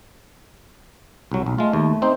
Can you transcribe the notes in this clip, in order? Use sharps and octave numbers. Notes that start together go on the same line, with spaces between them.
C2 F#3
B1
G#3 A3 F4
D#2
C4 D#4 C5